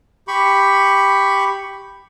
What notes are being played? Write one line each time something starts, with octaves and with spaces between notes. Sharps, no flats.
G4 B5 C#6